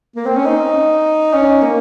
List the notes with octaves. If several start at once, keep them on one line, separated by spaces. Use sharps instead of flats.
A#3
C4
C#4
D#4
C#4
A#3